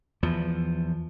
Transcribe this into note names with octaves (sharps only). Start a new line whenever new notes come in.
E2 F3